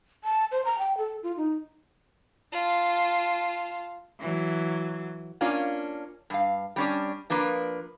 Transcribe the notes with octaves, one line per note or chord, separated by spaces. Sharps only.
A5
C5
A#5
G5
A4
F4
D#4
F4 A5
E3 F#3
A#3 C#4 D4 F4
G2 F5
G3 C#4 D4
F3 A#3 D4 B4